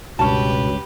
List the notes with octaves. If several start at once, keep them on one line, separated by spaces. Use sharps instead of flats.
C#2 G2 B2 C#4 G4 B4 A5